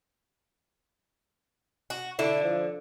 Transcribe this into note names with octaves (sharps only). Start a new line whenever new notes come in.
F#4
D3 E4
F3